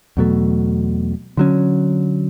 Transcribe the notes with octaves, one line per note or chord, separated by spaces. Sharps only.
E2 B2 F#3 A3
D3 F#3 C#4